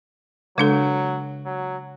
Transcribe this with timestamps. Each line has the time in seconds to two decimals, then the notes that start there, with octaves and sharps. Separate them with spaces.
0.57 C#3 F#3 G#3 D4 A4
1.46 F#3